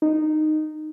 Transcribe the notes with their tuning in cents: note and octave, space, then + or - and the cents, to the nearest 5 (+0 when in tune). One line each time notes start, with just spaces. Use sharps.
D#4 -15